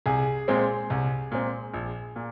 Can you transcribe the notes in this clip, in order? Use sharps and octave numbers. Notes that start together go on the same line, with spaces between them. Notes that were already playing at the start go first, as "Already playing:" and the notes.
C2 G#4
A#2 G#3 C4
C2
A#2 G#3 C4
A#1
A#2